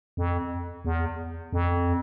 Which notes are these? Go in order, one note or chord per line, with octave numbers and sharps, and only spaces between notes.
F2
E2
F2